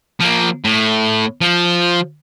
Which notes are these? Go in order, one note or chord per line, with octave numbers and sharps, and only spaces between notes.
F3 A#3
A2
F3